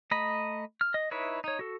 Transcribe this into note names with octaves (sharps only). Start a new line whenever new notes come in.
A3 D#5 A#5 B5
F6
D#5
D#4 E4 B4 C#5 E5
D#4 C#5
F#4 A4